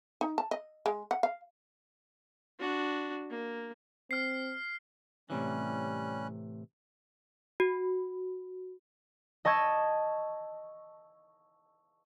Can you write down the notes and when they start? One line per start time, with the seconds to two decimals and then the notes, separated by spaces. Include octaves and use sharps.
0.21 D#4
0.38 A5
0.51 D#5
0.86 G#3
1.11 F#5
1.23 F5
2.59 D4 F#4
3.30 A#3
4.11 C4 F6 C7
5.30 A2 C3 E3 G3 C#4 F#6
7.60 F#4
9.45 D#5 A5 C#6 E6 G#6